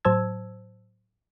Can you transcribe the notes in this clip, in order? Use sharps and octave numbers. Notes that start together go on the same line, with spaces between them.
A2 F#3 C5 A5 E6 G#6